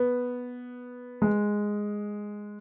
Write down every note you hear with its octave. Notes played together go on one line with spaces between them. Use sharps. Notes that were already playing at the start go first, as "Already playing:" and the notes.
Already playing: B3
G#3